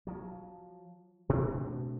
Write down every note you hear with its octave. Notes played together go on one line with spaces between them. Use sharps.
F3 F#3
B2 A3 C4 D4